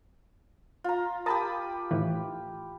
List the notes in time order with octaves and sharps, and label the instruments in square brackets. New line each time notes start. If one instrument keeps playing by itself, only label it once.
[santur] F4 A#5
[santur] G4 B5 D#6 [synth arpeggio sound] A#4 A5 A6
[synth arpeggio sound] A2 D#3 E3